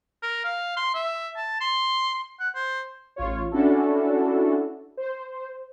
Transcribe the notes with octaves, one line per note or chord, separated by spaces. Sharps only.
A#4
F5
C6
E5
A5
C6
F#5
C5
A1 F4 C#5
C#4 D4 E4 F#4 A4
C5